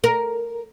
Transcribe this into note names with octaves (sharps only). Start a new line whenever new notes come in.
A#4